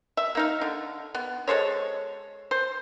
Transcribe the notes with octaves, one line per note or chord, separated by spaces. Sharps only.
E5
A#3 D#4 F5
D3
B3
G#3 A4 C5 C#5
C5